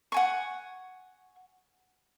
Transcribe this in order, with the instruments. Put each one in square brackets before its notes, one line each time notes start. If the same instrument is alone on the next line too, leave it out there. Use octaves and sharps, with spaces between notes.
[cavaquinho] F#5 G#5 C#6